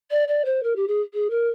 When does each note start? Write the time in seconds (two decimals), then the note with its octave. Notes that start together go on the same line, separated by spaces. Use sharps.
0.11 D5
0.28 D5
0.45 C5
0.63 A#4
0.76 G4
0.87 G#4
1.14 G#4
1.30 A#4